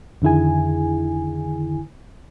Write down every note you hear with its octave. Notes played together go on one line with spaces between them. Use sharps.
F2 D3 D#3 E4 G#4 G#5